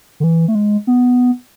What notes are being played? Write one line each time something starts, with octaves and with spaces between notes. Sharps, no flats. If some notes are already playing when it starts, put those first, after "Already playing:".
D3
E3
A3
G#3
B3